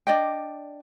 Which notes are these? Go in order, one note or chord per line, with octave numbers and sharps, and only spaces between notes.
D4 D5 D#5 G5